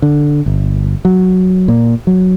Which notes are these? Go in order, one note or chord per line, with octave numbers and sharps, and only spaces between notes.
D3
G1
F#3
A#2
F#3